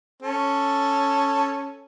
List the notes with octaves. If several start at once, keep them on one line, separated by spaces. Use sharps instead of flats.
C#4 A4